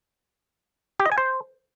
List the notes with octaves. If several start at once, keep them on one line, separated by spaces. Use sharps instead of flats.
G4
D#5
G#5
C5